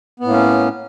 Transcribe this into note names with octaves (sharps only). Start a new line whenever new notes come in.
A2 A#3 B3 C#4